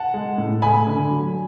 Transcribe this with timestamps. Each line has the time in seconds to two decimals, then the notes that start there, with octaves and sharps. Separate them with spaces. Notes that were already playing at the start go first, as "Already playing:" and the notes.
Already playing: F#5 A5
0.14 G#3
0.38 A2
0.62 A3 G#5 B5
0.87 D3
1.11 F#3